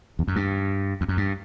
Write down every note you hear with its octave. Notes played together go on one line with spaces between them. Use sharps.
E2
F#2
G2
E2
F#2
G2